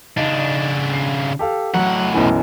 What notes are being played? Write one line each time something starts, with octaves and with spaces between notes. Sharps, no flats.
C#3 D4 D#4
C7
G4 A4 F5
A2 F#3 F#5
B1 F#2 E3